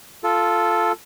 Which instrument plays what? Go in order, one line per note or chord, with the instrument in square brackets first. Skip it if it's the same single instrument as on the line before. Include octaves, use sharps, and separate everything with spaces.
[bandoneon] F4 A4